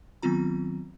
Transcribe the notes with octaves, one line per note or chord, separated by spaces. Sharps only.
D#3 F#3 B3 C4 F4 A#5